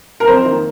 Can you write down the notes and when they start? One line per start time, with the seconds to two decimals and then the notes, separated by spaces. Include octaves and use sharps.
0.20 A#4
0.27 F2 C5
0.45 D#3 A#3